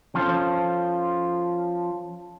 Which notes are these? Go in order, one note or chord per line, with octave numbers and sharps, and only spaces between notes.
F3 C#4 F4 A4 C5